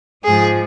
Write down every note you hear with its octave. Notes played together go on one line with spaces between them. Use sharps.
G#2 F3 G#4